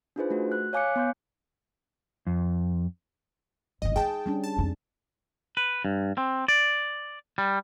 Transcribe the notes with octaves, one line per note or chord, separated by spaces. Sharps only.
D4 D#4 F4 G#4 B4 C5
A3 F#4
F#6
C#5 F5 G#5 D6 F#6 C#7
B3 C6 G6
F2
G1 D3 D#5
D#4 G#4 G5 A5
G3 C#4 D4
A5
F2 D#4
B4
G2
C4
D5
G3